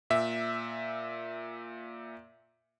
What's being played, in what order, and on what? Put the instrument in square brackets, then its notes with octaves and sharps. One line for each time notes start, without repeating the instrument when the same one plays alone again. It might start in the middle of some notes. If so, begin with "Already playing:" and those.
[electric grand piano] A#2 E5